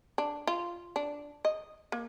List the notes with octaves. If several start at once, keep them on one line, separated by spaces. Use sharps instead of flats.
D4
F4
D4
D#5
A#3